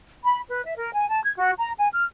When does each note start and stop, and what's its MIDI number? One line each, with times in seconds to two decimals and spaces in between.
0.24 0.41 83
0.50 0.64 71
0.65 0.74 76
0.77 0.94 70
0.94 1.08 80
1.09 1.22 81
1.23 1.33 92
1.38 1.52 66
1.58 1.72 82
1.77 1.89 80
1.92 2.05 89